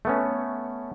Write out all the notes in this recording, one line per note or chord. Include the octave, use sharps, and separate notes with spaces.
A3 B3 C#4